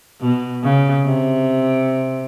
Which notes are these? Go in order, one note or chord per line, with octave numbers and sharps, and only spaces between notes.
B2
C#3
C3